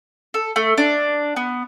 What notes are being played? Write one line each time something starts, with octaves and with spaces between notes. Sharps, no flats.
A4
A3
D4
B3